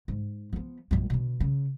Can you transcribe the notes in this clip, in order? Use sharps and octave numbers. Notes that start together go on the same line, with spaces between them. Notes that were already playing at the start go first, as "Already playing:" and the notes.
G#2
F3 B3
A#1 F#2
B2 D3
C#3